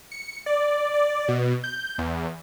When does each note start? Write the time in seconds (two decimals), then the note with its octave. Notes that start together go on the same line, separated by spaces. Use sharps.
0.12 C#7
0.46 D5
0.94 D5
1.28 B2
1.64 G6
1.98 E2